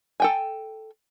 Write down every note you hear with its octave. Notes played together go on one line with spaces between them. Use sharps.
A4 G5 G#5